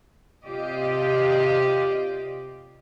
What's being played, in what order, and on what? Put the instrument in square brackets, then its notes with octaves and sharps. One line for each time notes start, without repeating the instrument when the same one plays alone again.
[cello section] C3 F4 G4 D5 D#5